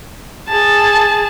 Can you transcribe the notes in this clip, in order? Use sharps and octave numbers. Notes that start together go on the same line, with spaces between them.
G#4 A5